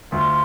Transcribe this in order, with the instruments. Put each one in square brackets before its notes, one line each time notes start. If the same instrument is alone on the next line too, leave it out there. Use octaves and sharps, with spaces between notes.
[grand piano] D2 [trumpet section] F4